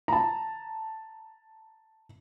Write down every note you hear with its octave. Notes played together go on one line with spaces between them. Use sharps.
A5 A#5